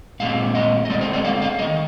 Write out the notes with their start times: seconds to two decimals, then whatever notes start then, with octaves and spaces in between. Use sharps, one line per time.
0.20 A#2 G#3 C4 F5
0.55 D#5
0.85 D#5
0.90 D3 G#3 C4 D5
1.01 C5
1.13 D5
1.25 F5
1.42 F5
1.59 A#3 D#5
1.62 D#3